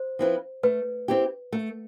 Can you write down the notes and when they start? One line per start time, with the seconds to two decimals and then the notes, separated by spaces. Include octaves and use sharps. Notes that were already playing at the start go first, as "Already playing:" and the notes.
Already playing: C5
0.19 F3 C4 E4 B4
0.63 A3 B4
1.08 C4 E4 G4
1.52 A3